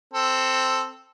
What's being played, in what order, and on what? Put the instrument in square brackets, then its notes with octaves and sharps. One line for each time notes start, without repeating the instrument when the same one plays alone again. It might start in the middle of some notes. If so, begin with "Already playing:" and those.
[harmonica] C4 A4